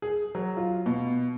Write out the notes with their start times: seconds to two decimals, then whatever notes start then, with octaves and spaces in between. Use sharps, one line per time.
0.02 G#4
0.35 F#3
0.57 F4
0.86 B2